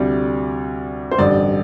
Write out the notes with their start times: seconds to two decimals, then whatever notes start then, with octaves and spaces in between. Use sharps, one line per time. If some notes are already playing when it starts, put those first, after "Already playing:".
Already playing: D2 C3 G3 D5
1.11 C5
1.18 A1 G2 D3 D5